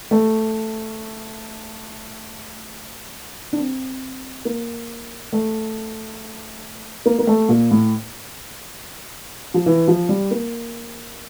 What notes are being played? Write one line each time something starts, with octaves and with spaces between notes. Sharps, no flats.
A3
D4
C4
A#3
A3
A#3
A#3
A3
A#2
A2
F3
E3
F3
G3
A#3